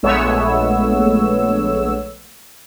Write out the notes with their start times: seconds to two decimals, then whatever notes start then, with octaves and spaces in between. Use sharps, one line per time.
0.03 A#1 G#3 A3 B3 C#5 E6